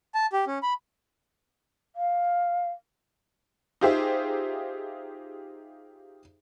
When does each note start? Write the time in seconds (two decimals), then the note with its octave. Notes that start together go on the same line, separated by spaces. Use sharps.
0.15 A5
0.33 G4
0.47 C#4
0.63 B5
1.96 F5
3.81 D#4 F4 G4 G#4 C5 E5